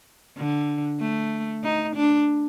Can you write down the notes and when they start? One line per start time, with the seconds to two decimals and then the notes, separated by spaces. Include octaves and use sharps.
0.37 D3
1.00 A3
1.63 D#4
1.95 D4